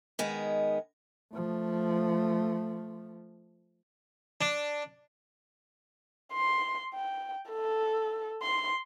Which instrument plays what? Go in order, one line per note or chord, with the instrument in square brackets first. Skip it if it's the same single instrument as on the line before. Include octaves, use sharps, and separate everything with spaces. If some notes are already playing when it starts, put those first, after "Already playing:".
[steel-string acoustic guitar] D#3 G#3 B3
[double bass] F3 A3
[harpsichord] D4
[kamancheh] C6
G5
A4
C6